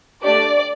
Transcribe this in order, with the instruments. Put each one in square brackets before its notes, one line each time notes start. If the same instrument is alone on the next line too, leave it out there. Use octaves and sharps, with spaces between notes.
[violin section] A3 D4 G4 D5